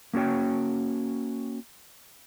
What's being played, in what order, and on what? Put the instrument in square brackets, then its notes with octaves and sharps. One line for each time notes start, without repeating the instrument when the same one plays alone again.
[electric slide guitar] A#3 C#4 F#4 C#5 G5